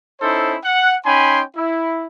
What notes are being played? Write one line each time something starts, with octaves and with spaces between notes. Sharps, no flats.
C#4 D#4 E4 A4 C5
F#5
C#4 D#4 G5 G#5 B5 C6
E4